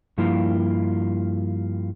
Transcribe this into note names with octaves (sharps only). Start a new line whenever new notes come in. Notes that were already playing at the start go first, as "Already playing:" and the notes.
G2 F3 A#3 E4 F4